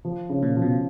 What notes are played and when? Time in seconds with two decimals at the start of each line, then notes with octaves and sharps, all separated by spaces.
0.05 F3
0.29 C#3
0.43 A#2
0.56 F3
0.62 B2